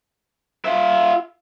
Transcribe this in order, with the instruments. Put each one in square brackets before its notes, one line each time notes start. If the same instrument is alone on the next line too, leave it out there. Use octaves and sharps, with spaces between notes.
[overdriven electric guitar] F4 E5